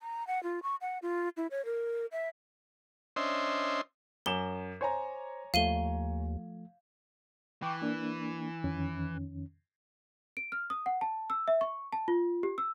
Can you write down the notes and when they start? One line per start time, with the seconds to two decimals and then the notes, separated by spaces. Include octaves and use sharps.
0.02 A#5
0.27 F#5
0.43 F4
0.63 C#6
0.81 F#5
1.02 F4
1.37 E4
1.51 C#5
1.65 A#4
2.12 E5
3.16 C#4 D4 C5 D#5 E5 C6
4.26 F#2 D6 E7 G7
4.81 C5 C#5 G#5 A#5
5.54 D#2 F3 A3 F5 D#7 G7
7.62 E3 G5 C#6 D6
7.82 A#3 D4
8.64 F2 D#3 C#4
10.37 D7
10.52 F6
10.70 D#6
10.86 F#5
11.01 A5
11.30 E6
11.48 E5
11.61 C#6
11.93 A5
12.08 F4
12.43 G4
12.58 E6